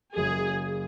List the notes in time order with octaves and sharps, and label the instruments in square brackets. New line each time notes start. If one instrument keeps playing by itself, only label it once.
[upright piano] F#1 F#2 C#3 [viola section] G#4